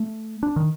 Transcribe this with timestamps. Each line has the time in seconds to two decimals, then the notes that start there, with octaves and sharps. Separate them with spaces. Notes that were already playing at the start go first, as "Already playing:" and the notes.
Already playing: A3
0.43 D4
0.56 D#3